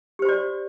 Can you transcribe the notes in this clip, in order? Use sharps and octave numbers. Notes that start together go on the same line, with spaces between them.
F#4 G4 C5 D5